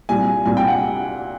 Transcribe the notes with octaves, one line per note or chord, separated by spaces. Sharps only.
C2 A#2 G3 G#5
C2 A#2 G3 G#5
G5
F#5